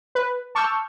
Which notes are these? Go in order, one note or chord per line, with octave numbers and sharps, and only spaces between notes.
B4
A5 C#6 D6 E6 F6 G6